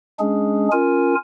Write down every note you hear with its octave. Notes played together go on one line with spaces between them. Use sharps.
G#3 C#4 D4 G#4
C#4 F4 A#4 G#5